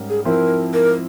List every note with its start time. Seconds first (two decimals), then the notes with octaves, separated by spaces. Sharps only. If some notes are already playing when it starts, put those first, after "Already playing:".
Already playing: G#2 G3 C#4 A#4
0.09 G#4
0.25 F3 C4 E4 A#4
0.74 A#4